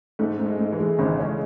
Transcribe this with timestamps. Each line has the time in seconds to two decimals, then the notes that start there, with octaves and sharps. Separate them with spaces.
0.19 G#2 A3
0.39 G#2
0.46 G#3
0.59 G#2
0.73 E3
0.78 G#3
0.99 G#1 C#3
1.19 G#3 C#4